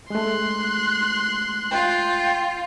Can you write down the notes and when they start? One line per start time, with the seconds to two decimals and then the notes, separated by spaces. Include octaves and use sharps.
0.10 G#3 A3 C6 F#6
1.72 F4 G5